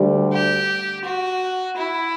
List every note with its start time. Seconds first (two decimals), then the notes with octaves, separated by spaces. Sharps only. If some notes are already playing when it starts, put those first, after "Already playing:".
Already playing: D2 D3 G3
0.32 G4
1.04 F#4
1.77 E4